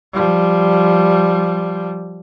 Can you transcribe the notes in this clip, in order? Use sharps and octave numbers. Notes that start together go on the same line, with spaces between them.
F3 G3